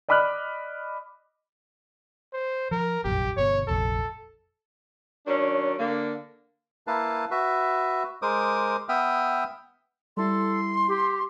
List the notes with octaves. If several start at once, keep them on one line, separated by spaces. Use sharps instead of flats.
D5 D#5 B5 D6 F6 F#6
C5
F3 A#4
F1 A#1 F#2 G4
G1 B2 C#5
F1 A#1 F2 A4
D#3 F#3 C#4 D4
D3 A#3
A#3 E4 B4 F5 A5
F#4 B4 E5
G#3 A#4 C5 D6 D#6
B3 E5 G5 D#6 F6
G3 E4 A4 C6
G4